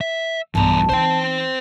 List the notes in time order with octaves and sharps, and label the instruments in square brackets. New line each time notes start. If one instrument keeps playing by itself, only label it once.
[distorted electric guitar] E5
[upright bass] B1 G2 [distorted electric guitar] E2 A#5 [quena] A5
[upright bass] E3 D#4 [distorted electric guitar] C5 G5